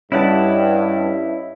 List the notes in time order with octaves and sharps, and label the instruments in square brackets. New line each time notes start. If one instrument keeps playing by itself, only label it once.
[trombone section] G2 [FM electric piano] C#4 C#5 D#5 [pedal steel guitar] E4 F#5 A5